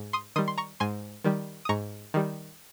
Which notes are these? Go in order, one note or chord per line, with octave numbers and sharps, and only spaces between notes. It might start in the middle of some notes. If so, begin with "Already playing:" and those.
Already playing: G#2
C6 D#6
D#3 G3 C6 D#6
C6
A#5 C#6
G#2 G#5 C6
D#3 G3
D#6
G#2 A#5 C#6
D#3 G3